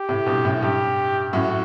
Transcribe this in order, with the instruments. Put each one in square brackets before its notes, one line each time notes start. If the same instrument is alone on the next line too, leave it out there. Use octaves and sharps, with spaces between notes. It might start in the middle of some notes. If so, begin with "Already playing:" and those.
Already playing: [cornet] G4
[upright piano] A2 C3
G2 B2
F#2 A2
[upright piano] G2 [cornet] G4
[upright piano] F#2 A2 [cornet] F#4